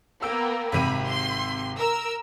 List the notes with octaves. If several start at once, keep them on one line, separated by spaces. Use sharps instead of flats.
A#3 B3 G5 E6
G#1 C3 B5 D#7
C6
A#4 E6